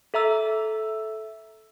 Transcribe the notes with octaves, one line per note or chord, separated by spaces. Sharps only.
A4 E5 A#5 E6